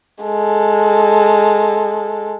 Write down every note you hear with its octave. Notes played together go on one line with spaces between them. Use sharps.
G#3 A4